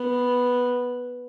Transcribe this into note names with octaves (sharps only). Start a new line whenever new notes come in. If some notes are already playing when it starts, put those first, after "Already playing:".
Already playing: B3